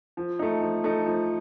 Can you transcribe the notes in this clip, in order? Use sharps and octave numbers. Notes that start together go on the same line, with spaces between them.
F3
A3 D#4
F3
A3 D#4
F3